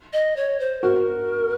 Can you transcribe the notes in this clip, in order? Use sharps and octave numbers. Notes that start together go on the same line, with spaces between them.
D#5
C#5
C5
F#4 A#4